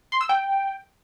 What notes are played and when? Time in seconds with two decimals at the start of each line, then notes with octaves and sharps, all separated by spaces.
0.12 C6
0.21 E6
0.29 G5